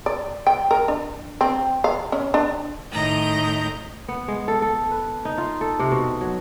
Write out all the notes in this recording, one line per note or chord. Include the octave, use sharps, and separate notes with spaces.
D5
G5
A#4
D4
C4
F5
C#4
D4
A2 D#3 D#5 A#5 G6
B3
G#3
A4
A4
B4
D#4
F4
A4
C3
B2
F#3